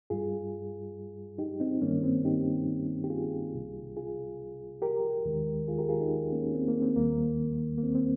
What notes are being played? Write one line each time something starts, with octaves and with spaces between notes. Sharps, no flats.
G2 G3 F4 G#4
D#4 G4
C4 D#4
G2 D#3 G3 A#3 C#4
C4
D#4 G4
G4
F4 G#4
C2 C3 G3
F4 G#4
G4 A#4
D#2 D#3 G#3
F4 G#4
G4 A#4
F4 G#4
D#4 G4
A#3 C#4
C4
A#3
C4
D#2 D#3 G3 A#3
A#3
C4
C4